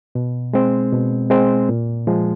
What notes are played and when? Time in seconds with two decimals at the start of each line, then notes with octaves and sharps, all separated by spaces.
0.15 B2
0.53 G#3 C4
0.93 B2
1.30 G#3 C4
1.69 A#2
2.07 F3 G#3